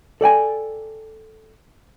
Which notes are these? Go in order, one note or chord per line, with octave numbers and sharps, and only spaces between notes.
A4 D5 G5 G#5